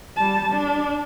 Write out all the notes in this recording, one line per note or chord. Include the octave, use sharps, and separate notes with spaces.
G3 A5
D4